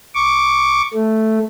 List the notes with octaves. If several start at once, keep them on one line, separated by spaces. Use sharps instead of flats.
C#6 D6
A3